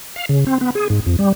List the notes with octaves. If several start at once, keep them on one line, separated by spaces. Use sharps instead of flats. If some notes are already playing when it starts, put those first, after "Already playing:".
F5
C#3
C4
B3
G#4
G#2
F2
G3